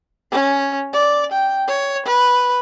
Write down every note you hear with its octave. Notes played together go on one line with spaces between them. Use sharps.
C#4
D5
G5
C#5
B4